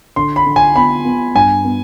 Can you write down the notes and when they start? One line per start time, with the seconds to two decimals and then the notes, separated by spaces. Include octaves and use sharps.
0.16 D3 C6
0.36 B5
0.46 D3
0.56 G#5
0.76 B3 B5
1.05 B3
1.35 G2 G#5
1.65 B3